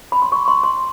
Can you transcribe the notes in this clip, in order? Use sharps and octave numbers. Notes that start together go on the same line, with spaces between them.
B5
C6
C#6
C6
C6